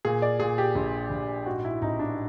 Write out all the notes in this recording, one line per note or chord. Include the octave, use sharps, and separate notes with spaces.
A#2 G#4
D5
A#2 G#4
G4
A#1
A#1
G#2 F#4
E4
A1 D#4
D4